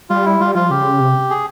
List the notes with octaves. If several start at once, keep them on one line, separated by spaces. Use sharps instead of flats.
G3 F4
E4
G3 F4
F3 F4
C#3 G4
C3
G#4